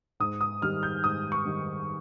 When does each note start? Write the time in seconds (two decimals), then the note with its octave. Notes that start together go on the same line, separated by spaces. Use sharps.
0.20 G#2 D#6
0.41 D#6
0.62 D#3 G3 F6
0.83 G6
1.04 G#2 D#6
1.32 C#6
1.45 D#3 G3